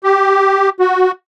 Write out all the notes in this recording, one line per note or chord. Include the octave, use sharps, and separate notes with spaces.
G4
F#4